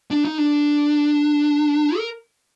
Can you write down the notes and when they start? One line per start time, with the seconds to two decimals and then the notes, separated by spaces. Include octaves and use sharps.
0.11 D4
0.25 D#4
0.38 D4
1.97 A#4